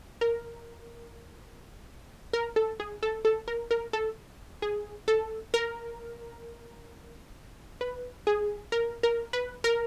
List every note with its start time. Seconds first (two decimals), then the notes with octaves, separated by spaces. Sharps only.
0.21 A#4
2.33 A#4
2.56 A4
2.80 G#4
3.03 A4
3.25 A4
3.48 A#4
3.71 A#4
3.93 A4
4.62 G#4
5.08 A4
5.54 A#4
7.81 B4
8.27 G#4
8.72 A#4
9.03 A#4
9.33 B4
9.64 A#4